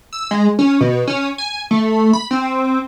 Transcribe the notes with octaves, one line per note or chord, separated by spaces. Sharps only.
E6
G#3
C#4
B2
C#4
G#5
A3
B5
C4